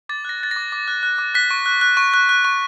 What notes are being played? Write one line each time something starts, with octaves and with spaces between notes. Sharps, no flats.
D6 A6
F#6 A#6
F#6 A6
A#6
D6
D6
F#6
F#6
D6
F#6 B6
C#6
F#6
F#6
C#6
F#6
F#6
C#6